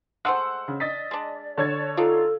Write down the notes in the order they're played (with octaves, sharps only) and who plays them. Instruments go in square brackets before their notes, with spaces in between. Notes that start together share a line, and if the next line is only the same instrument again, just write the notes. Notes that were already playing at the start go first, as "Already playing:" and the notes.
[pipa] G#3 A3 C5 [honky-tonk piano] F#5 E6
[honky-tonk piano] C#3
[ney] D5 [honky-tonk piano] D#5 A6 B6
[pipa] G#3 D4
[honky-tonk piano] D3 C#5 G#6 [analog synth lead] A5
[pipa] D4 D#4 [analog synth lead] F4 [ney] A4